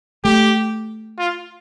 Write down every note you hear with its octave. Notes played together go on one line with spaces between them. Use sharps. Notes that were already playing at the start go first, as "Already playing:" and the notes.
A3 G4
F4